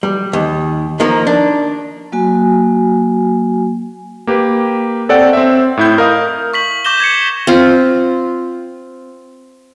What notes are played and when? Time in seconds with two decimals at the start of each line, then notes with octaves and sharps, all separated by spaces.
0.03 G3
0.33 D#2
1.00 D#3 F3 A#3
1.27 D4
2.12 F#3 A#3 F#4 G#5
4.27 A#3 G4 B4
5.09 C4 A4 C#5 D5 F#5 G5
5.33 C4 E5
5.77 A2 E4 G6
5.98 A#4 D#5 F5 D#6
6.54 C#6 B6 F#7
6.85 C#6 D6 G6 A#6 E7 G7
7.00 G#6 C#7
7.47 C4 F4